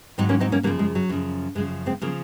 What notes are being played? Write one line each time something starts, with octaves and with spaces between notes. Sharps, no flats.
G#2 D#3 F#3 C4 D#4
A#3 C#4
C4 D#4
A#3 C#4
F#2 C#3 F3 F#3 A#3
G#3
F#3
F#2 C#3 F3
F#2 C#3 F3 G#3
G#3 C4
C#3 F3 F#3 A#3